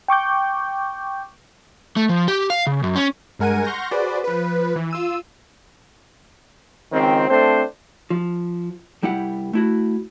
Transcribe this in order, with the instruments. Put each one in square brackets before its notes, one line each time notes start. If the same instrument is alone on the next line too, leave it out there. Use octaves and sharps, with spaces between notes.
[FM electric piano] G5 C#6 D6 G6
[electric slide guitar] A3
F3
G4
F5
C#3
F#2
C#4
[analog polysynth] G2 G#3 A#4 F#5 G#5 D#7
F#5 C6 C#6 F6 G6 A#6
F#4 G#4 B4 C5 D5
F3 B4
E3
F4 E6 D#7
[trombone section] C#2 D#3 C4
A3 C4 D4 C5
[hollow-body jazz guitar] F3
C2 G3 E4 G4 F#5
A3 E4 F#4